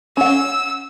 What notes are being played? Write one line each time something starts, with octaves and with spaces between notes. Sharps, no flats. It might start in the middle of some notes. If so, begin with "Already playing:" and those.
C#4 F#5 E6